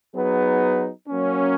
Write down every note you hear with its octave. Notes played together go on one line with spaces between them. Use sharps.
F#3 B3 D#4 G#4 B4
F#3 A#3 C#4